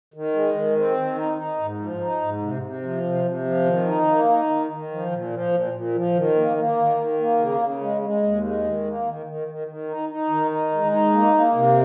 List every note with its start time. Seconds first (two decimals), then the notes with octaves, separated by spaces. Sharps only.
0.14 D#3
0.33 G#3
0.54 D#3
0.76 C4
0.97 D#3
1.17 D#4
1.37 D#4
1.59 G#2
1.79 F3
2.01 D#4
2.21 G#2
2.41 C3
2.62 C3
2.83 F3
3.03 C3
3.25 C3
3.45 F3
3.65 D#3
3.87 D#4
4.07 A#3
4.29 D#4
4.49 D#3
4.70 D#3
4.91 F3
5.11 A#2
5.32 F3
5.53 A#2
5.73 A#2
5.94 F3
6.15 D#3
6.35 A#3
6.57 A#3
6.77 D#3
6.97 D#3
7.19 A#3
7.39 C#3
7.60 C#3
7.81 G#3
8.02 G#3
8.23 D#2
8.43 G#3
8.64 D#3
8.85 A#3
9.05 D#3
9.26 D#3
9.48 D#3
9.68 D#3
9.89 D#4
10.09 D#4
10.29 D#3
10.51 D#4
10.72 G#3
10.92 D#4
11.13 A#3
11.34 A#3
11.54 C3